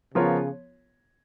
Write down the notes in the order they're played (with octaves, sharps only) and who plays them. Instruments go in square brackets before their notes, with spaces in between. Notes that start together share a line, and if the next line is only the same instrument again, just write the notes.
[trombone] C#3 [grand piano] F3 B3 F4 A#4 C#5